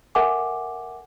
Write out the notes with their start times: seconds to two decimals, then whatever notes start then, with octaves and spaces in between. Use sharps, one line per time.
0.15 A4 A#4 E5 F#5 G#5 D6